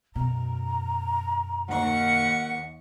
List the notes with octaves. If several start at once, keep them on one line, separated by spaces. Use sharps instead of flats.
F#2 B2 A#5
D#2 F#5 C#6